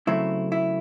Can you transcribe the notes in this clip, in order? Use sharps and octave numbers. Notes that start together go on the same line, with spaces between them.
C#3 F#3 A3 C4 E4
E4